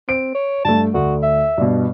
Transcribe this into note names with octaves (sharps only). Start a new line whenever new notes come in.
C4 D7
C#5
G2 A3 A5
D2 F#4
E5
G2 B2